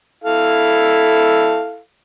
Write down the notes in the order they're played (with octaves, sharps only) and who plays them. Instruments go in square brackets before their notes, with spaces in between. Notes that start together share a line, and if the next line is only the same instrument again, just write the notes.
[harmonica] E4 A4 F5